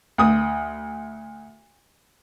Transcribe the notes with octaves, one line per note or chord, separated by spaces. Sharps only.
D2 D#6